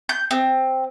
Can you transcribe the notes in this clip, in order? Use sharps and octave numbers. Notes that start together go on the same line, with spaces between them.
G6
C4